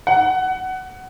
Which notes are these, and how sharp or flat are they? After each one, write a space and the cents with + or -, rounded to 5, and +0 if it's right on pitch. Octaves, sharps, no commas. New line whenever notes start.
F#5 +15